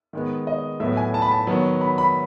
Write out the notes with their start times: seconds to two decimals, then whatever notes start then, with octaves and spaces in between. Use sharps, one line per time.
0.13 D#3 G#3 B3
0.47 D#5
0.80 A2 F#3 B3 E5
0.97 G#5
1.14 A5
1.22 B5
1.31 A5
1.47 D#3 F#3 B3
1.81 B5
1.98 B5